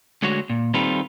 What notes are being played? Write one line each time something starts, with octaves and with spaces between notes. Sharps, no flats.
D2 D3 G#3 F#4 C#5
A#2
D#3 G3 C4 F4 A4 B4